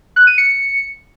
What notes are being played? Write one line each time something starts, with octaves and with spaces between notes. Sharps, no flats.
F#6
D#7
C#7